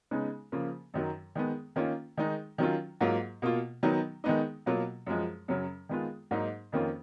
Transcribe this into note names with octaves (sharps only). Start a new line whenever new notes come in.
C#3 G#3 B3 D#4
C#3 F3 A#3 F4
F#2 D#3 F#3
D#3 G#3 B3
D#3 A#3 C#4 F4
D#3 G#3 D#4
D#3 F#3 C#4 F4
G#2 F#3 A#3 F4
B2 A#3 F4
D#3 F#3 B3 D#4
D#3 G#3 B3 D#4
B2 F#3 A#3 F4
F#2 F3 G#3
F#2 C#3 F#3 C#4
D#3 G#3 B3 F4
G#2 F#3 A#3 D#4
F2 D#3 A#3 C#4 F4